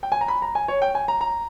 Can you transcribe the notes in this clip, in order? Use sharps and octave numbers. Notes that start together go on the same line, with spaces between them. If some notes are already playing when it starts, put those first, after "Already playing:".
G5
G#5
A#5
B5
A#5
G#5
C#5
G5
G#5
A#5
A#5